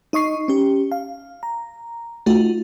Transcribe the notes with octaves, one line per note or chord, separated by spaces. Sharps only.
D#4 D#5 C#6 C7
C#4 G4
F5
A#5
A3 D#4 F4 F#4